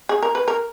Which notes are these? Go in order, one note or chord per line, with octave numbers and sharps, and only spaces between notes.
G#4
A#4
B4
A#4